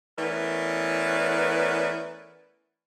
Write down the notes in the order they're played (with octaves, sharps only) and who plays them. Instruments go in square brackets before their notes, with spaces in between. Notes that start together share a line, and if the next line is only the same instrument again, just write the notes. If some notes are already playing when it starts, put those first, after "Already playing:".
[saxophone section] E3 A3 B3 C#4 A#4 D5